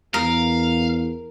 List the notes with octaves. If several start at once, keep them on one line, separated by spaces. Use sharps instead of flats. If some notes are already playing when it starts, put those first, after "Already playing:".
E2 A#4 F5